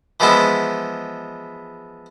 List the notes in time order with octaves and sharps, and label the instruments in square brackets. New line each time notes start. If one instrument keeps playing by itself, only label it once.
[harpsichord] E3 F3 G#3 B3 E4